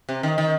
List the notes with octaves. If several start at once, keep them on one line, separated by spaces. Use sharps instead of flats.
C3
D#3
D#3